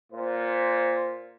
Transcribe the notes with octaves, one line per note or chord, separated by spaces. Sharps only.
A#2 C5